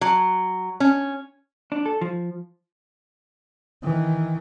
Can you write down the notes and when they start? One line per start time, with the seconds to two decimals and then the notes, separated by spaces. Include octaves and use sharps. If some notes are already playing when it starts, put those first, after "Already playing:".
0.01 F#3
0.80 C#4
1.72 D4
1.86 A4
2.01 F3
3.83 D#3 E3